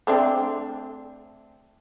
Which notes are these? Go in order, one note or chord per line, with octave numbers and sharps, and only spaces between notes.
A3 C4 D4